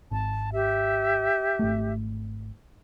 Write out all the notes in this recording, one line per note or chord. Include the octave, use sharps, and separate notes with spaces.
G#1 A5
G4 E5
G#1 A3